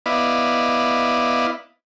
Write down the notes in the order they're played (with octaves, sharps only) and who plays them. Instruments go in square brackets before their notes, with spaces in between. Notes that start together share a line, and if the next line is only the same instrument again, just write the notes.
[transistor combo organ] B3 E4 D5 D#5 F5 B5